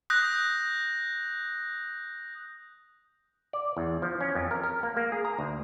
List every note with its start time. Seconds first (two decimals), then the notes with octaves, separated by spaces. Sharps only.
0.10 D#6 F#6 G6 A#6
3.53 D5
3.77 E2
4.02 F3
4.21 C#4
4.35 F2
4.51 A#4
4.63 A#4
4.83 A#3
4.97 A#3
5.12 G#4
5.25 A#5
5.39 D2